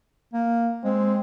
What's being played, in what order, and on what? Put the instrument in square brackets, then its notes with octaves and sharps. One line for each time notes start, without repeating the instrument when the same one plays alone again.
[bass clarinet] A#3
[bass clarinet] G#3 [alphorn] C4